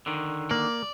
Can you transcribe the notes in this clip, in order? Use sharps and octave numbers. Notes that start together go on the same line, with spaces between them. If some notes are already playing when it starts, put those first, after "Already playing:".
D3 D#3
A#3 D5